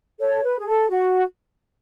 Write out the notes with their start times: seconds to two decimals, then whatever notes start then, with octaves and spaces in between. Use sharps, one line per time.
0.20 A4 C#5
0.44 B4
0.60 G#4
0.67 A4
0.90 F#4